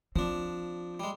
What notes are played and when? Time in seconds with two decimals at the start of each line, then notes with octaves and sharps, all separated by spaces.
0.16 F3 C4 D4
1.00 G3 G#3